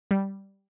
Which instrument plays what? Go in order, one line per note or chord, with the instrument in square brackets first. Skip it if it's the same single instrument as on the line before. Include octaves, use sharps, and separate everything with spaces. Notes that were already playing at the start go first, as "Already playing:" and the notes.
[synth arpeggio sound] G3